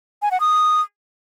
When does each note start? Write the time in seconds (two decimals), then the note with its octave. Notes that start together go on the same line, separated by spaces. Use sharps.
0.22 G#5
0.31 F#5
0.40 D#6